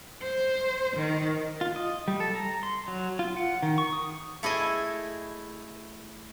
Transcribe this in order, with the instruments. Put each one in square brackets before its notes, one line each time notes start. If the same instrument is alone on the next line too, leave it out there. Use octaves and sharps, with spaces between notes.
[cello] C5
D#3
[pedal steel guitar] F4
D#5
G3
A4
A#5
C6
F#3
F4
F#5
D#3
C#6
D#6
[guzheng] A3 E4 G#4 D#5